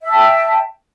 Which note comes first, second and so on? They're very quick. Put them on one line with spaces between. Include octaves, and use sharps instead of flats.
E5 A5 G5